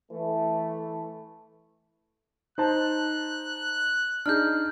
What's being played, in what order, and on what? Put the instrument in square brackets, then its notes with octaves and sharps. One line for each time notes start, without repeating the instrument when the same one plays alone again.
[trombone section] E3 A3
[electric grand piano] D#4 C5 A5 [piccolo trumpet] F#6
[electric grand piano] D4 D#4 G#4 [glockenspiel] F6 G6